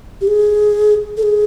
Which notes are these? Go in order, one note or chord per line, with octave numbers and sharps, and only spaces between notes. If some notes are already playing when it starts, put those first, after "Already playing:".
G4
G#4
A4
G#4